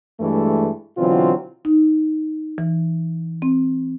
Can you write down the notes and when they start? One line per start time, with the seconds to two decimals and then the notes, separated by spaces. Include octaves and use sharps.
0.20 G2 E3 G#3 A3
0.97 B2 D3 E3 F#3 C4 F4
1.65 D#4
2.58 E3
3.42 C4